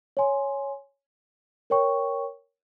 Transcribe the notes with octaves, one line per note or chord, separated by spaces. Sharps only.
C#5 G#5 C6
A#4 C#5 G5 C#6